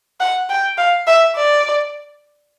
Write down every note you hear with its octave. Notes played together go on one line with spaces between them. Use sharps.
F#5
G5
F5
E5
D5